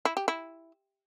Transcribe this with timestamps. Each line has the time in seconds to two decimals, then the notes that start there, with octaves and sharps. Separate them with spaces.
0.05 E4
0.17 G4
0.28 E4